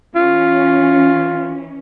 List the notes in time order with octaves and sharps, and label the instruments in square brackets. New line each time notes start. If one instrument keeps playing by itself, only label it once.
[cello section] E3 C#4 [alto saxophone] F4